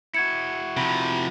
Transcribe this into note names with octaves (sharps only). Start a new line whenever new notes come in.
E4 F#4 G#6 C#7
C3 F3 B5